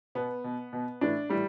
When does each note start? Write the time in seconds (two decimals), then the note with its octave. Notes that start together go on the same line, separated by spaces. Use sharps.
0.15 B2 B3
0.44 B2
0.73 B2
1.01 A2 E3 D4
1.30 A2 E3 G3